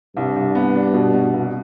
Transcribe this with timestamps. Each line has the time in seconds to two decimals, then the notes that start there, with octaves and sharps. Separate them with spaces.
0.16 C2 G2
0.36 C2
0.55 B3
0.75 D4
0.94 B2
1.14 B2
1.34 C2